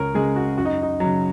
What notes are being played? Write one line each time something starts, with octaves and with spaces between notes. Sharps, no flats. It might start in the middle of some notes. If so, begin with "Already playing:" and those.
Already playing: C#2 C#3 A#4 C#5
C#3 G#3 G#4
F#4
F#2 F#4
D#4
D#4
C#3 F#3